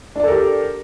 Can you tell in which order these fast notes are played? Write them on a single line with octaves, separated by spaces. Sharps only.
D4 D5 A4 A#4 G4